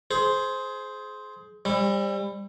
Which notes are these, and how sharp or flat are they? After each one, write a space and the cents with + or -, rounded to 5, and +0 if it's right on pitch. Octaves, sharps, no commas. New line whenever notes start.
G#4 +25 C5 +0
G3 +25 C4 +45